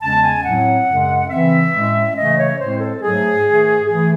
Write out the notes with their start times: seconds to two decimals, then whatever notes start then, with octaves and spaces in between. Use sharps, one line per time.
0.02 E2 C#3 G#3 C#4 A5
0.23 G#5
0.44 A2 F#3 C4 F#5
0.88 F#2 C#3 G#3 C#4
1.30 C#3 E3 C4 E5
1.73 A2 G#3 C#4
2.16 C#3 E3 A3 C#4 D#5
2.39 C#5
2.59 A2 G#3 C4 C5
2.80 A4
3.02 G#2 F#3 A3 G#4
3.46 G#2 D#3 A3
3.88 E3 A3 G#4